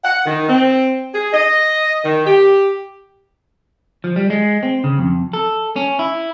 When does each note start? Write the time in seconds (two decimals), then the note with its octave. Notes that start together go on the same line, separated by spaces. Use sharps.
0.04 F#5
0.26 D#3
0.49 C4
1.14 G#4
1.33 D#5
2.05 D#3
2.26 G4
4.04 F3
4.16 G3
4.30 G#3
4.63 C4
4.84 C#3
4.98 F2
5.33 A4
5.76 C#4
5.99 E4